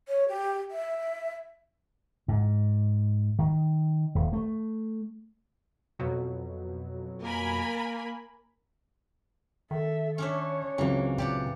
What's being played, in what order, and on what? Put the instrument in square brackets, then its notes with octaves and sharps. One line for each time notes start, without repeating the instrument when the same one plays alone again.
[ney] C#5
G4
E5
[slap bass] G#2
D#3
D#1
A3
[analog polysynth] F2 B2 F#3
[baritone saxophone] A#3 [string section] A#4 G#5 B5
[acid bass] D#3 [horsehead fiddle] A4 E5
[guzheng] C#4 D4 E5 [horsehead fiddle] C#5
[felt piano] C#2 F#3 C4 [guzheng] E3 A#3 [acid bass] C#4
[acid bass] A#2 [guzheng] G4 D5 F#5